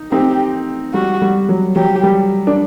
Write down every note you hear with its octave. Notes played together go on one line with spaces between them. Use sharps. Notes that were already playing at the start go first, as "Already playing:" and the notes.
Already playing: D#4
C4 D#4 G4
G3 F#4
G3
F#3
F#3 G4
G3
D4